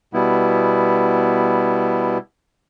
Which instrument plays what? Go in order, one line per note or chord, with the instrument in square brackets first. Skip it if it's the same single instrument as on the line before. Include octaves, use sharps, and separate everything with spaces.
[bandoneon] B2 G3 B3 E4